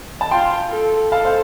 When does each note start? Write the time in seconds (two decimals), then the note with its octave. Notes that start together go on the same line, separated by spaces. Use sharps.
0.21 A5
0.31 F4 G5 C6
0.71 A4
1.12 A4 F5 A5
1.25 C5 F5